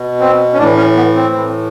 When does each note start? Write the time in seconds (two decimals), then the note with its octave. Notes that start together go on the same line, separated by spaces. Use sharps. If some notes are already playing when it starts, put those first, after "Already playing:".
Already playing: B2
0.20 C4
0.53 C#4
0.58 A2 E3 D4
0.77 C#4
0.97 B3
1.15 C4
1.34 A2 E3